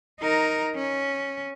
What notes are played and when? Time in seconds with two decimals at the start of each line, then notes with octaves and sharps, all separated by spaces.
0.21 D#4 A#4
0.75 C#4